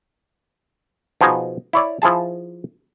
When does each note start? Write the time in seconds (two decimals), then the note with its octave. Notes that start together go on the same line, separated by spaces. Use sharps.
1.21 B2 F3 D#4 G#4 D#5
1.73 E4 C#5 D5
2.02 F3 E4 G#4 A5